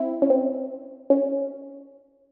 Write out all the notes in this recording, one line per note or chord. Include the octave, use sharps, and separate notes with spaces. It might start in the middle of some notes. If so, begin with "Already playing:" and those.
Already playing: C4 E4
C#4
C4
C#4